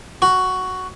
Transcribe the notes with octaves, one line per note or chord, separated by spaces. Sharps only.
F#4